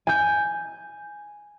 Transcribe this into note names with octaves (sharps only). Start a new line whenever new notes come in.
G#5 G6